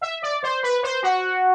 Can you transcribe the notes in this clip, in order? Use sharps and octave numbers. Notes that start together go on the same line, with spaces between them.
E5
D5
C5
B4
C5
F#4